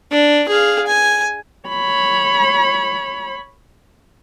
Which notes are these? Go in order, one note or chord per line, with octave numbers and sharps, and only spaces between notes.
D4
G#4 F5
G#5
C#5 B5